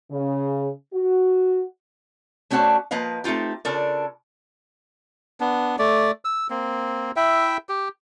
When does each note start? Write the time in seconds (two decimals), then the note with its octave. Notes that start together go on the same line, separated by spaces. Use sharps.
0.10 C#3
0.92 F#4
2.51 A3 C#4 D4 F#4 C5 A5
2.91 F3 A#3 B4 D#5 F5
3.24 A3 C4 D#4 F4 G4
3.65 C#3 D4 F4 A4 A#4
5.40 B3 D4
5.79 A3 D5
6.25 E6
6.50 A#3 C4
7.16 E4 E5 G5
7.69 G4